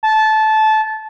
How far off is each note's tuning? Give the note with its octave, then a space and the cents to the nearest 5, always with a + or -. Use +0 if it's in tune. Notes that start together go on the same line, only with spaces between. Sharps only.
A5 -20